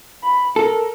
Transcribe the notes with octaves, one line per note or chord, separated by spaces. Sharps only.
B5
A4 A#4